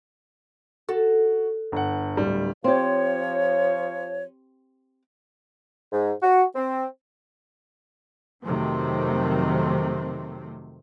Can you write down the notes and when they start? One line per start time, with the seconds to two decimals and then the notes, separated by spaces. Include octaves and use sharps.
0.89 F#4 A4
1.72 G1 F#5
2.17 D1 G3
2.64 F3 C4 G4 C#5
5.92 G#2
6.22 F#4
6.55 C4
8.43 F2 C3 D#3 F#3 A3 C4